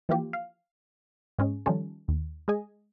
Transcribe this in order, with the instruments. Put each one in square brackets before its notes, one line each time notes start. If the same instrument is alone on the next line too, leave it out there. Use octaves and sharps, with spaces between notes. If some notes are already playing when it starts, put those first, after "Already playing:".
[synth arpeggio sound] E3 F3 A#3 F4 G4
F5
G#2 G#3 C#4
D#3 F3 G3 C#4 A4
D#2
G#3 G#4 D#5 G#5